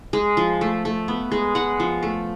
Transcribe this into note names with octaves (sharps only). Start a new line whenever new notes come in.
G#3
F3
A3
A3
B3
G#3
G#3 F#5
F3
A3